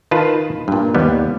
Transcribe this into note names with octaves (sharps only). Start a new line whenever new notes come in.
D#3 F4 B4 A5
G2 A#2
D#2 G3 B3